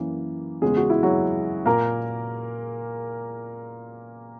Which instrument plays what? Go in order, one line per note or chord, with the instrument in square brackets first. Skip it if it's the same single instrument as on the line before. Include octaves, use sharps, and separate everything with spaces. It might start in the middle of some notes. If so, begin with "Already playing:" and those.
Already playing: [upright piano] F#2 E3 A#3
E2 C#3 G#3 G#4
F#4
E4
F#3 F#4
A#2 A#3 A#4